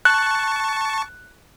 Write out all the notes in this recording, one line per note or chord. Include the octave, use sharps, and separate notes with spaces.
A5 C#6 F#6